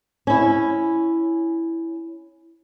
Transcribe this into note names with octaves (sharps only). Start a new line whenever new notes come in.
C#4 E4